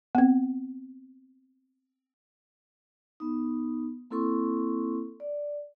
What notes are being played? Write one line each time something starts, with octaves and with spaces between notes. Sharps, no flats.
B3 C4
B3 D#4
A#3 C4 E4 A4 C6 C#6
D5